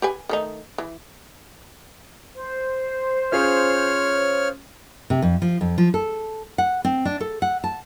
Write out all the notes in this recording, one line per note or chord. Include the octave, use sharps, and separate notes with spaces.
G4 B4 G#5
D#3 A3 D#4
E3
C5
C#4 F4 G#4 C#5 F6
C3
F2
F3
F2
F3
A4
F#5
C4
D4
A4
F#5
A5